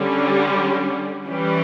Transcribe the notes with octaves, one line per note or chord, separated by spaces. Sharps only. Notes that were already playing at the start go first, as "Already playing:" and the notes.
Already playing: D3 G3 C#4
E3 G3 C#4 G4